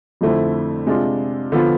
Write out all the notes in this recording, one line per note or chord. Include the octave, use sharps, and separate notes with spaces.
F2 D3 A3 C4 E4
C3 G#3 D4 F4
D3 F3 B3 F4